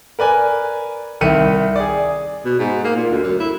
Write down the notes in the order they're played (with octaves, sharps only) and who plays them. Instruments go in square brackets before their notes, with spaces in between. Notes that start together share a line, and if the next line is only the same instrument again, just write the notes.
[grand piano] A#4 B4 D5 G#5
C2 D#3 E5 C#7 D#7
G#4 D5
[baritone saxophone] B2
G#2
A#3
A#2
D2
F#2
E4